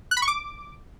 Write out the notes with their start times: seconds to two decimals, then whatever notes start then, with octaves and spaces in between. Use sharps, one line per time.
0.11 F#6
0.17 B5
0.22 C#6
0.28 D6